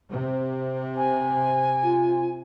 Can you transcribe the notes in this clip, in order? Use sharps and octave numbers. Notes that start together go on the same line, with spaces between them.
C3
G#5
F4